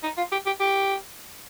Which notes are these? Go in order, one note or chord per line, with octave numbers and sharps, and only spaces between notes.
D#4
F4
G4
G4
G4